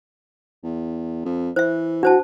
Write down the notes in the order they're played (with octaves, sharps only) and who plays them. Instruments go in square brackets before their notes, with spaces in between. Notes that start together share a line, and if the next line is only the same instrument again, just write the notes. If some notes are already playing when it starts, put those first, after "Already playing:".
[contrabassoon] E2
F2
[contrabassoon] E3 [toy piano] C5 E5
[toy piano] D4 C5 A5 [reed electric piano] F#4